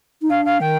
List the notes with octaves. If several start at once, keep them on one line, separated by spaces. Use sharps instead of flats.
D#4
D4 F5
F5
D#3 G5